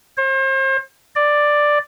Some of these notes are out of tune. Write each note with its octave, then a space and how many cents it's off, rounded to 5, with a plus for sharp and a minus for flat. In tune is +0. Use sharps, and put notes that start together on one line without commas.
C5 +40
D5 +5